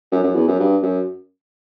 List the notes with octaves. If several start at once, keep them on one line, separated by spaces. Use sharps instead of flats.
F#2
F#2
E2
F#2
G2
F#2